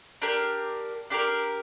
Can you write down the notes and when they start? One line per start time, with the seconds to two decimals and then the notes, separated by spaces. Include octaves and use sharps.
0.22 D4 G4 A#4
1.10 D4 G4 A#4